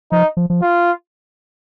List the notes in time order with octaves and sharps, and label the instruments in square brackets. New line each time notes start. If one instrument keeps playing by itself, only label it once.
[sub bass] F3 [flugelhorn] D#4
[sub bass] F3
F3
[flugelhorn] F4